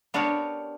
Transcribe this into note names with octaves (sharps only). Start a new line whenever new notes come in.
B3 D4 G4 A#4 C#5